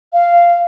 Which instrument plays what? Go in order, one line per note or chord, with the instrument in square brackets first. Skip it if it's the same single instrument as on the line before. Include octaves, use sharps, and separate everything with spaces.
[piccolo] F5